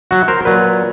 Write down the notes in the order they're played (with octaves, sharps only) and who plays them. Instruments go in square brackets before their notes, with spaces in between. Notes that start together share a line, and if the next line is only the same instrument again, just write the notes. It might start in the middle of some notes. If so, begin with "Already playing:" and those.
[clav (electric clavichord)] F#3 F#4
A#4 C5
[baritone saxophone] A#2 [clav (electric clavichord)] F#3 B4